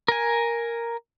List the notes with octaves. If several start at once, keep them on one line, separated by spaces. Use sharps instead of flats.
A#4 G#5